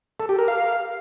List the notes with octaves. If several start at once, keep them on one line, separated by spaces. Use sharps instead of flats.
A4
G4
A#4
F5